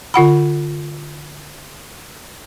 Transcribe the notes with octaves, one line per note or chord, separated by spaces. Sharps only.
D3 F4 F#5 B5